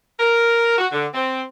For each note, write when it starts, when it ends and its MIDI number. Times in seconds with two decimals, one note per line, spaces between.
0.20 0.77 70
0.79 0.87 66
0.93 1.07 50
1.14 1.43 60